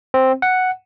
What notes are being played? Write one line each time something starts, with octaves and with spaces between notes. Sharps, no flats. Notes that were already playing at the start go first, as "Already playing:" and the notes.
C4
F#5